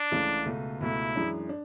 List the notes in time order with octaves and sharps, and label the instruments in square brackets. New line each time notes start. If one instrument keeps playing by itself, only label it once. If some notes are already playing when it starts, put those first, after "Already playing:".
Already playing: [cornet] D4
[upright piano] C#2 C#3 E3 A3 E4
C#2 B2 A3
[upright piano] C#2 B2 A3 [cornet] E4
[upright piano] F#2 E3 G#3 D4
D4